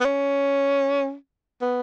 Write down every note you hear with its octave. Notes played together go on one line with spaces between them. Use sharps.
B3
C#4
B3